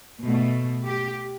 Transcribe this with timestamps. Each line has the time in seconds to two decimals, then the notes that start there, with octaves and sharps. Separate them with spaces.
0.22 B2 A3
0.87 G4